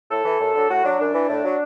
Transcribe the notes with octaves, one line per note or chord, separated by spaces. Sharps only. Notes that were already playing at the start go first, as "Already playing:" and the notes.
A2 A4
E3
F#2
D3 F#3
A2 F#4
F#3 D4
F#2 D4
E3
A2
F#3